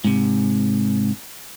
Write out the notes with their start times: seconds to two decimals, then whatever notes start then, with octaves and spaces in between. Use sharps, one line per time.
0.04 G#2 C3